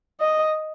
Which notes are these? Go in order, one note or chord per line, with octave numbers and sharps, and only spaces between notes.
D#5